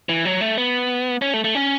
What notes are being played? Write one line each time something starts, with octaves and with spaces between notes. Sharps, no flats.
E3
F#3
A3
B3
C#4
A3
A3
C#4